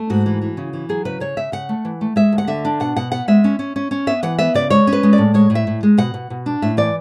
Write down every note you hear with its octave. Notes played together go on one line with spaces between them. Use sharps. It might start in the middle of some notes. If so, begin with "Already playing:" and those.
Already playing: A3
G#2 F#4
E3
E3
C#3
E3
F#3 G#4
C#3 B4
C#3 C#5
C#3 E5
C#3 F#5
A3
E3
A3
G#3 E5
D2
F#5
D3 E5
D4
B2 F#5
B2 F#5
B3 F#5
G#3 E5
C#4
C#4
C#4
C#4
B3 E5
E3 F#5
B3 E5
C#3 D5
G#3 C#5
C#4
B4
G#3
D5
A2
G#3 C#5
A2
E5
A2
G#3
B2 F#5
B2
B2
D4
A2 E5
E3 D5